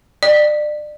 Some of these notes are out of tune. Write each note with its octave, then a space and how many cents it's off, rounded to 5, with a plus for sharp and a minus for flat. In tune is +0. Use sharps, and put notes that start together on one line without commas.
D5 +30